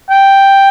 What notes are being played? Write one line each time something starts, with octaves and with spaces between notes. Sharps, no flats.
G5